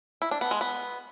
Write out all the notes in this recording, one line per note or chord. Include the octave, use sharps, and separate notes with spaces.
E4
D4
B3
G#3
B3